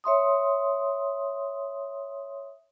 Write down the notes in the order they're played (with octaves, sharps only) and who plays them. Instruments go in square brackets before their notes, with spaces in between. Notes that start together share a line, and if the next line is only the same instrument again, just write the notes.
[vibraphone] C#5 E5 C6 D#6